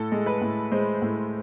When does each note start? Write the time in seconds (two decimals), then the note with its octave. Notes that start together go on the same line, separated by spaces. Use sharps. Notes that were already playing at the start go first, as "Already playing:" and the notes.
Already playing: A2 A4
0.12 G#3
0.26 B4
0.41 A2
0.72 G#3 C5
1.02 A2